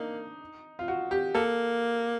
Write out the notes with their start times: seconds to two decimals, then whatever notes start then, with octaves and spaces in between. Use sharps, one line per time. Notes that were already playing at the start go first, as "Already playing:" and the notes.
Already playing: A#3 D4 D#4
0.79 F4
0.88 F#4
1.11 G4
1.35 A#3 A4